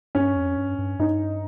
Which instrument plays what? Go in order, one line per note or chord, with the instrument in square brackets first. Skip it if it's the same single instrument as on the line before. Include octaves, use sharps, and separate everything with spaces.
[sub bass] G2 [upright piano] C#4
[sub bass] F2
G2
G2
[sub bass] G2 [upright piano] D#4